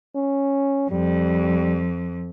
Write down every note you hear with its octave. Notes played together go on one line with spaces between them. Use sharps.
C#4
F2 G3